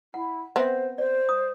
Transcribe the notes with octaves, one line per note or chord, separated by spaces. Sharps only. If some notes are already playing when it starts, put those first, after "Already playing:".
E4 F#5
B3 C4 C5 E5 F#5
C5 D5
D#6